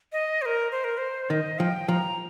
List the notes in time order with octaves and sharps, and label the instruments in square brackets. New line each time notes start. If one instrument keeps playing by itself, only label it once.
[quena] D#5
C5
A#4
C5
A#4
C5
[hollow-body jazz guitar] D#3 [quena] D#5
[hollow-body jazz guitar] F3 [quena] G5
[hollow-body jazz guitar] F3 [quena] A#5